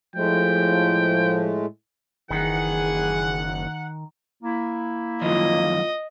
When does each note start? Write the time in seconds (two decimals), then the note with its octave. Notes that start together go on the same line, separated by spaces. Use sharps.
0.16 A2 F3 G#3 A3 G5
2.30 F#1 D#3 E3 G#4 F#5
4.44 A#3 E4
5.22 F#2 D#3 F3 F4 D#5